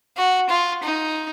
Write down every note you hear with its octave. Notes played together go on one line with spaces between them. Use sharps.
F#4
F4
D#4